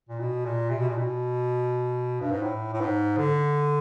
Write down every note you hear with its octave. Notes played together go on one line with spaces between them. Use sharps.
A#2
B2
A#2
C3
B2
A#2
B2
G2
G#2
A2
A2
G#2
D3